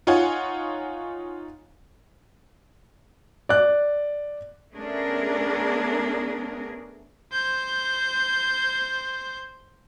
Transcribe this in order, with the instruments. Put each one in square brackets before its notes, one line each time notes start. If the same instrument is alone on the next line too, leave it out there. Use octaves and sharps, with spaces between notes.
[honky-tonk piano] D#4 F4 C#5 F#5 G#5
[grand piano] D5 F#6
[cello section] A3 B3 C#4 D4 G#4 A#4
[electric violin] C5 G6